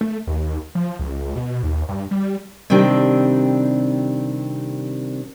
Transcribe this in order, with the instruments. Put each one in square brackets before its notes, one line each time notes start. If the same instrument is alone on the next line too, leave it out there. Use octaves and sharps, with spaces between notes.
[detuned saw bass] A3
D#2
F3
C#2
B2
D#2
G2
G3
[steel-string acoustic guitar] C3 D#3 G3 C4 D4